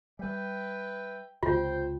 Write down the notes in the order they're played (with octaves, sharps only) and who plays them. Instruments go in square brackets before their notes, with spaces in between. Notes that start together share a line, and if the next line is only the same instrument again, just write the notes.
[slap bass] G3 [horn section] B4 E5 G5
[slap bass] C#2 C3 [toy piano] F4 [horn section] C5 G5